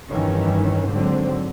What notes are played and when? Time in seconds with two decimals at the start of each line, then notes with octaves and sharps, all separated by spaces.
0.11 F1 G2 D#3 E3 C#4
0.87 G#1 G#2 D3 F#3 C4